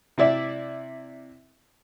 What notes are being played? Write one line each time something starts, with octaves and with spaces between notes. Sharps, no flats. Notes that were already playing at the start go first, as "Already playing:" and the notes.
C3 E4 D5 E5